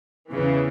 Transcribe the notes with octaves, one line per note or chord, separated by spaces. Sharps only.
E2 C#3 E3